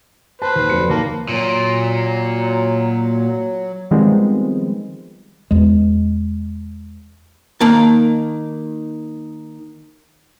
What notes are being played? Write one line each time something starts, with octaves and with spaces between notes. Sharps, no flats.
B4 C5 A5
D#2
F1 F#3 C#7
D#2 A#3 A5
A#2 F#3
D#3 F3 G3 G#3 B3 C4
E2 G#3
D#3 A#3 A5